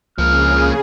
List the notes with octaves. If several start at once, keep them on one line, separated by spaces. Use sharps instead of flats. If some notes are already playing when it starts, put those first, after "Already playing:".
C#2 C#3 F3 A#3 G#4 F6